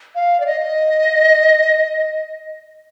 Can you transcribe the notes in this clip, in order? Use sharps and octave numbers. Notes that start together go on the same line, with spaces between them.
F5
D5
D#5